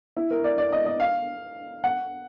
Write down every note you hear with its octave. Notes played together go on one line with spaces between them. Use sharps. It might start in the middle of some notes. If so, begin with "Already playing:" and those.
E4
A#4
D5
D5
D#5
D#5
F5
F#5